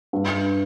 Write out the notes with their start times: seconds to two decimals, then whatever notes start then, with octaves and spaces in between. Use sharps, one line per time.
0.13 G2